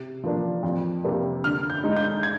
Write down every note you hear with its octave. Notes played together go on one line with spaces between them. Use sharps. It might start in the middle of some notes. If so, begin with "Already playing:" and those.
Already playing: C3
F3 A#3 D4
F2
C3 G3 A#3 D4
D3 F6
G6
G#3 D#4
G6
G#6